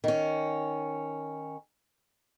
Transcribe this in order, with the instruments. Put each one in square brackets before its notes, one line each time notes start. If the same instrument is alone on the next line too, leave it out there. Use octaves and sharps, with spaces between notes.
[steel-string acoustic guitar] D#3 C#4